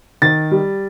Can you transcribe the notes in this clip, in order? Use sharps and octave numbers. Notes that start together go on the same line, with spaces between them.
D#3 A6
G3